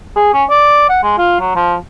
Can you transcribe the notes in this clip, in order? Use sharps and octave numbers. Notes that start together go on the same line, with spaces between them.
G#4
C#4
D5
F#5
G#3
F4
F#3
F3